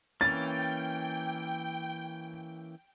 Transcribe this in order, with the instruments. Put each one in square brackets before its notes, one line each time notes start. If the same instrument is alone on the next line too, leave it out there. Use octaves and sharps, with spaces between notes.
[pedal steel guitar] E3 A#3 C#4 [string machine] G5 [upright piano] A6